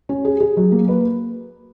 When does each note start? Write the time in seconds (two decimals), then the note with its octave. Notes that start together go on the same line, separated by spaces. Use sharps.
0.09 C#4
0.25 G#4
0.40 G#4
0.57 F#3
0.72 A#3
0.88 B4